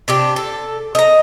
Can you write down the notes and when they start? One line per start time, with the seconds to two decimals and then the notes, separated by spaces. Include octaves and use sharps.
0.08 C3 D4 G4
0.36 A4
0.95 D#5 A#5